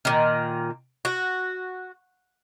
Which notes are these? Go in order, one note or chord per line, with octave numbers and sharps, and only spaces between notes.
A#2 D#3
F#4